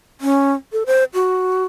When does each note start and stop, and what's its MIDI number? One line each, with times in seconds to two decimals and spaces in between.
0.21 0.52 61
0.73 0.83 69
0.86 1.04 72
1.14 1.64 66